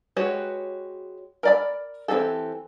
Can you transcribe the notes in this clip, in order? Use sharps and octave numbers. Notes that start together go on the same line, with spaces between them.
G#3 F#4 G4 B4 C#5
A#4 D5 B5
E3 F#3 C4 G4 A4